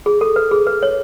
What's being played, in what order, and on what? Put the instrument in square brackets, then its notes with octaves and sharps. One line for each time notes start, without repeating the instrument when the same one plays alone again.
[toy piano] G#4
A4
B4
G#4
B4
C#5